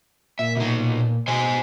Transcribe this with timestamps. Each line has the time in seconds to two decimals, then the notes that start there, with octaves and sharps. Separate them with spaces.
0.39 A#2 E5
0.57 B2 D#4
0.77 A#2
1.28 B2 C5 D#5 G#5